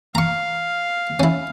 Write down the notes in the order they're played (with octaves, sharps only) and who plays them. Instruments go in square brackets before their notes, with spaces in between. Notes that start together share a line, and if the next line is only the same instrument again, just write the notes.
[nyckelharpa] F5 [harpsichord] A#5 C#6
[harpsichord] C#4 E4